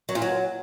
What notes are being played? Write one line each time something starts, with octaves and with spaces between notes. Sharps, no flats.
F#3
A#2
F#3